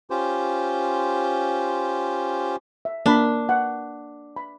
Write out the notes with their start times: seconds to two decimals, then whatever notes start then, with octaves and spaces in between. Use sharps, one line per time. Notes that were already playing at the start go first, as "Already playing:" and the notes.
0.10 C#4 F4 G4 C5
2.85 E5
3.06 A#3 D4 A#4 B5
3.49 F#5
4.36 B5